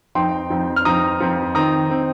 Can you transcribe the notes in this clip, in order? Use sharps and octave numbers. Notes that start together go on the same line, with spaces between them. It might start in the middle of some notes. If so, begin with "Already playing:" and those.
F2 F3 C4 D#4 G5 C6
F2 F3 C4 D#4
F6
F2 F3 C4 D#4 A#5 D#6
F2 F3 C4 D#4
D#3 C4 D#4 A#5 D#6
D#3 C4 D#4